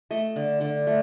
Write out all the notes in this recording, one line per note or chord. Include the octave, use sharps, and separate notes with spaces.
A3 D#5
D3
D3
A3